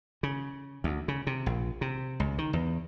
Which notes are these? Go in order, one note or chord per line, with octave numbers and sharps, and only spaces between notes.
C#3
D2
C#3
C3
A#1
C3
C#2
D#3
E2